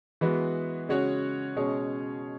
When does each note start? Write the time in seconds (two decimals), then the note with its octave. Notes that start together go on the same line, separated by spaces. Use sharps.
0.21 E3 G#3 B3 F#4
0.89 C#3 G#3 C#4 F#4 C#5
1.56 B2 G#3 C#4 G#4 C#5